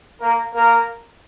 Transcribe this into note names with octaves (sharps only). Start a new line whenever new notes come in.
A#3 A#4
A#3 A#4